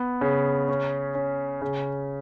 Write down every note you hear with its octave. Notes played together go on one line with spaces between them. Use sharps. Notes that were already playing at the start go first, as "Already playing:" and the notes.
Already playing: B3
C#3
C#4
C#4
C#3